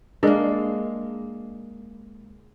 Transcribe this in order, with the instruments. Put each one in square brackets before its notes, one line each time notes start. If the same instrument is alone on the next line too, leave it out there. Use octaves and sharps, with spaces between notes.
[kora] G#3 A#3 [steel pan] D4 A#4